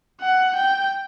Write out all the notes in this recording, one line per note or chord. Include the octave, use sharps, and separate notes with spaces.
F#5
G5